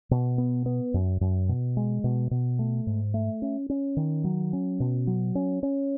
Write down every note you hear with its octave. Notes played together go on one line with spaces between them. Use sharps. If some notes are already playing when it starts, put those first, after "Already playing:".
B2
B3
B3
F#2
F#2
B2
G#3
B2
B2
A3
G#2
A3
C#4
C#4
D#3
F#3
C#4
B2
F#3
C#4
C#4